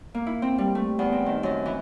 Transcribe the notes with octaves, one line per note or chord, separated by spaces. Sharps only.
A#3
E4
C4
G3
A3
E2
C4
D#3
F#2
E3